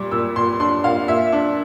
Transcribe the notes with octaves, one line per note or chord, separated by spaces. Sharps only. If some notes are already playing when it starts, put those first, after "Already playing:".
Already playing: A#2 G3 D6
A#2 E6
A#2 C6
D4 C6
A#2 F5
A#2 E5
D4